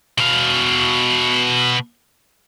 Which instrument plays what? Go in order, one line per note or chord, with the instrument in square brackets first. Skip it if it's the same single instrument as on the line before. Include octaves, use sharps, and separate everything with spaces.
[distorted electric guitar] B2 F5